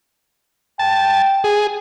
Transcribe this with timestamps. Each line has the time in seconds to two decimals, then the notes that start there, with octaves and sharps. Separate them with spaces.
0.79 G5 A5
1.44 G#4